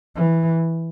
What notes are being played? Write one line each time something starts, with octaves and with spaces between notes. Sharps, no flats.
E3